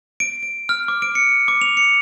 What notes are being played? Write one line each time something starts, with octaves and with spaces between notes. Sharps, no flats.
D7
D7
F6
D6
D7
C#7
D6
F7
C#7